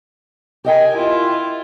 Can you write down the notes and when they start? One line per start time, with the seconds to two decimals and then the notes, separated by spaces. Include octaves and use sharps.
0.65 G4 A#4 D#5 G5 G#5
0.95 E4 F4